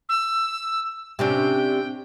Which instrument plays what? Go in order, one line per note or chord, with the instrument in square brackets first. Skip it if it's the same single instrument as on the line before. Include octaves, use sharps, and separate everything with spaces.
[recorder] E6
[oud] C3 C#4 D4 [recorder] G5